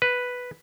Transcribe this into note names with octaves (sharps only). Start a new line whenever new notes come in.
B4